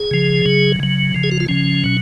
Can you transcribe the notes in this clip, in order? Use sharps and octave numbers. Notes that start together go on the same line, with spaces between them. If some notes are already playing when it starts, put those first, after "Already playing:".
Already playing: G#4
C#3 F3
C#3 F#3
C#3 F#3
C#3 F3
G#4
F#4
F4
C#3 F3 C#4
B2 F#3